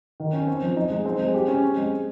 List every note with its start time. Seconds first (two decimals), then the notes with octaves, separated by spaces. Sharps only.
0.20 D#3
0.33 C#4
0.48 C4
0.62 F3
0.76 D#4
0.90 G#3
1.06 C4
1.19 G#3
1.34 G4
1.48 C#4
1.62 C4
1.77 G#3